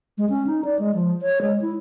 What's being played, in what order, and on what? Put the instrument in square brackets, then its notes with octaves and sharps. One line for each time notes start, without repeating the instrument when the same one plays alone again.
[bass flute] G#3
C#4
D#4
D5
G#3
F3
C#5
G#3
E4